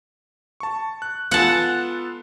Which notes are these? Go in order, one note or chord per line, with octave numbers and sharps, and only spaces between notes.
A5 C#6
F#6
B3 F4 A4 F#5 A5